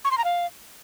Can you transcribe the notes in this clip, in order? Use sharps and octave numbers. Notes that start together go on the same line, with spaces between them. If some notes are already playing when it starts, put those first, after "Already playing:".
C#6
C6
A#5
F5